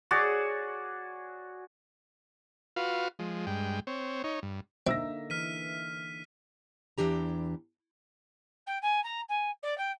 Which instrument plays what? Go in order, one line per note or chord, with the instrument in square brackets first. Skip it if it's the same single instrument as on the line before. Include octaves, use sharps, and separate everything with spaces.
[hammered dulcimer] F#4 G#4 C#5 D5
[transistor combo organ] F4 F#4 B4 F5
F3 G#3
G2 G#3 G5
C4 C#5
D#4 C#5
G2
[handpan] D3 A#3 D#4 [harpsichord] C4 [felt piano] E5 E6 A#6
[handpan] E3 [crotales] F6 B6 D#7
[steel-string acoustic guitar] E2 E3 D4 G4 A#5
[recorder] G5
G#5
A#5
G#5
D5
G5